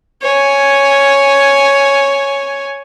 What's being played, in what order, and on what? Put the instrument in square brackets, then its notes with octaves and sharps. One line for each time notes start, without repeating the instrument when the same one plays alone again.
[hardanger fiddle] C#5 G#5